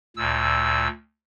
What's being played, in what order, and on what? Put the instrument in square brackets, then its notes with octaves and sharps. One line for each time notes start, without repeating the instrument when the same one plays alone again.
[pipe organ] D2 A#2 E6